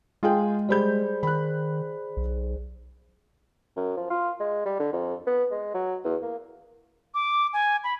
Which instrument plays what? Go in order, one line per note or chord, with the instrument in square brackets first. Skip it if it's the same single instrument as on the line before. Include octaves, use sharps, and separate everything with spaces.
[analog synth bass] G#3 [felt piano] F4 G#4 G5
[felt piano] G3 B5 G6 [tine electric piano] G#4 C5 D5
[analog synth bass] D#3 [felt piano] B5 F#6
[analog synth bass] B1
[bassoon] F#2
F3
F4
G#3
G3
D3
F2
B3
G#3
F#3
E2
A#3
[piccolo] D6
G#5
B5